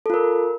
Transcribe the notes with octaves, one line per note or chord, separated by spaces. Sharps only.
F4 A4 A#4